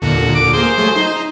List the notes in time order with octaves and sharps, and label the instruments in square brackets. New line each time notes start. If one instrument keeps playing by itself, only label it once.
[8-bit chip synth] D#2 A#2 D3 [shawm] F#4
[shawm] D6
[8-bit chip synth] A#3 G#4 [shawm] C5
[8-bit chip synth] F#3 A3 G#4
D#4